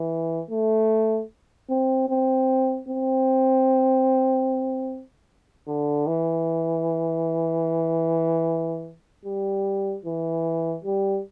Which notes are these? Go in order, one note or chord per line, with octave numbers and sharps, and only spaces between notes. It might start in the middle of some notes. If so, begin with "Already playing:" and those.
Already playing: E3
A3
C4
C4
C4
D3
E3
G3
E3
G3